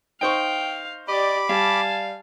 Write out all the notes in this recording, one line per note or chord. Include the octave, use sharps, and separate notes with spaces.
D#4 C5 F5 G5 C#6
G4 D5 D#5 B5 D6
G3 F5 G#5 A5